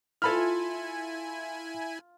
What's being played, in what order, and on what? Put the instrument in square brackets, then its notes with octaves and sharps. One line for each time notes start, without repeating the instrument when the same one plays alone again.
[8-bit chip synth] E4 G#5 [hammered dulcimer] F4 [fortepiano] A4 B5 F6